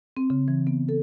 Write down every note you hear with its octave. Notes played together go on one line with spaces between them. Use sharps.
C4
C#3
E3
B3
A4